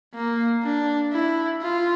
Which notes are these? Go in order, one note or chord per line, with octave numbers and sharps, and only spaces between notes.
A#3
D4
E4
F4